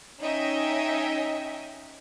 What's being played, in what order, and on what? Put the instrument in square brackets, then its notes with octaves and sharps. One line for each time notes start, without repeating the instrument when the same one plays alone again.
[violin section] C#4 D#4 D#5 E5 G5